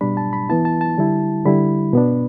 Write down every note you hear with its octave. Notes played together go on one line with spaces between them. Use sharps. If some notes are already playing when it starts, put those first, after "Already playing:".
B2 G3 D4 B5
A5
B5
E3 B3 E4 A5
A5
A5
D3 G3 E4
D3 G3 E4 B5
B2 B3 D4